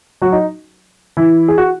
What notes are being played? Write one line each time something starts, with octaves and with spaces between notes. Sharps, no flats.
F#3 F#4
D#4
E3 E4
G#4
F#4